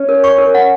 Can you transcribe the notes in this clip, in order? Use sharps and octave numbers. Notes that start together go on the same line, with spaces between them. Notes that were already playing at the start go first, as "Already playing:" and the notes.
Already playing: C#4
A#4
C#6
A#4
F#5